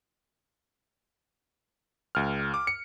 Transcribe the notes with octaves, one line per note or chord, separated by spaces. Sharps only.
C#2 F6
D6
C#7